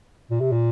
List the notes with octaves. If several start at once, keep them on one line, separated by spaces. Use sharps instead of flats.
A#2
C3
A#2